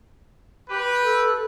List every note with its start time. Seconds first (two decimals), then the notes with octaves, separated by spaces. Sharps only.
0.69 G4 B4
1.03 A4